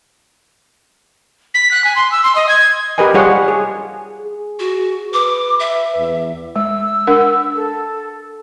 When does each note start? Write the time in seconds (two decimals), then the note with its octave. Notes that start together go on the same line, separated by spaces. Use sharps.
1.54 B6
1.71 F#6
1.84 G#5
1.96 C6
2.12 E6
2.24 C6
2.35 D#5
2.49 G#6
2.98 G4 A#4 B4 D#5 G#5
3.14 G3 F4 G#4 C#5 F#5
3.48 G#4
4.21 G#4
4.59 F#4
5.13 B4 D6
5.60 E5
5.97 E2
6.56 G#3 E6
7.07 D4 A#4 F#5
7.56 A4